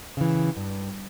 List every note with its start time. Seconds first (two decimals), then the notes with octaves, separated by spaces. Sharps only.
0.17 C#3 E3
0.57 G2